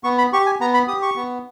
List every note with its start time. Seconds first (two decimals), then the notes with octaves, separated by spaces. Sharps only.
0.04 B3 C#6
0.18 B5
0.33 G4 C#6
0.46 G#5
0.60 B3 A#5
0.74 B5
0.88 G4 D#6
1.02 C#6
1.16 B3